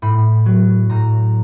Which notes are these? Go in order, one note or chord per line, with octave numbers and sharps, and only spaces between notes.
A2 B5
F#3
A2 A#5